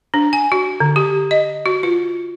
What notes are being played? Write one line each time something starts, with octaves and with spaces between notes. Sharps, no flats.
D4
G#5
F#4
D3
G4
D#5
F#4
F4